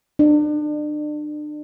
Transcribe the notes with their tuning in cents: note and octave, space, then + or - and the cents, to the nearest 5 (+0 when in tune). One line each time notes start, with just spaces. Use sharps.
D4 +35